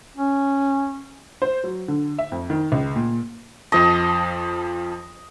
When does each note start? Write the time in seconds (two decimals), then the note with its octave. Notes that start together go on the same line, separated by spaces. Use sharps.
0.17 C#4
1.42 C5
1.64 F#3
1.88 D3
2.18 E5
2.32 F2
2.50 D#3
2.72 C#2
2.96 A#2
3.72 F2 F3 D#5 A5